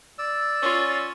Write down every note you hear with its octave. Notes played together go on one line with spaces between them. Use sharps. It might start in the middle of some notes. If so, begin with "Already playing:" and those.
D5 E6
C#4 F4